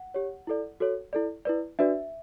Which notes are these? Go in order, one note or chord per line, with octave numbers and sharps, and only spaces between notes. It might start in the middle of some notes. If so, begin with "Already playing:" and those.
Already playing: F#5
G4 C#5
E4 A4 D5
F#4 A4 C#5
E4 A4 D5
E4 B4 D5
D4 F#4 B4 D5 E5